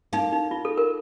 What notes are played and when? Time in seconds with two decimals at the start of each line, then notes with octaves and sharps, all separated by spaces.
0.13 A#3 D#4
0.32 D#4
0.51 F4
0.65 A4
0.77 A#4